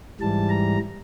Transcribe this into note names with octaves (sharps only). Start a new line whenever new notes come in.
G#2 E3 G3 A5
A#5